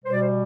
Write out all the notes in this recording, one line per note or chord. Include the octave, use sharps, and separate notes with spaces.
B2 G3 C5
D5
C5